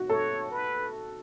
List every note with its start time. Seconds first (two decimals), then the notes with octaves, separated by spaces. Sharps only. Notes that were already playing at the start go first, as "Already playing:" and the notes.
Already playing: F#4
0.10 A4 C#5
0.51 B4